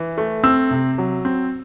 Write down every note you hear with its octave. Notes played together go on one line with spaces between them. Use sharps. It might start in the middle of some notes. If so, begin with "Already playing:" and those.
Already playing: E3
A3
C4 E6
C3
F#3
C4